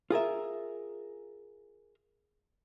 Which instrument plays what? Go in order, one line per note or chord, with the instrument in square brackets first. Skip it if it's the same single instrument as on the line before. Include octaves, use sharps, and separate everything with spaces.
[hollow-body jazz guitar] F4 G#4 A#4 E5